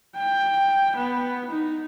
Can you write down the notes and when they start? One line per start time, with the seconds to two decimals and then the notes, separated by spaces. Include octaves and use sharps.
0.16 G5
0.96 B3
1.50 D#4